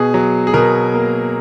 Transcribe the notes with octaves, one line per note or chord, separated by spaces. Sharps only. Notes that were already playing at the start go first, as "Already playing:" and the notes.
Already playing: B2 G#4
F#3
G#4
B2 A#4
A#3